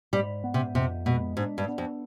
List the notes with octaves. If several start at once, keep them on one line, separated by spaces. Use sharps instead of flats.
G#2 G3
B3
C3
F2 C3
B2 G#3
G#2 D4
G2
B3
F2